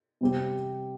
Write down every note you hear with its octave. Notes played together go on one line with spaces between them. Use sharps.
C3 G3 C4 G4